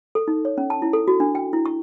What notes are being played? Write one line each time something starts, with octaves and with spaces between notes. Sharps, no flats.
A4
D#4
C#5
C#4
A5
E4
A4
F#4
D4
G5
E4
C#6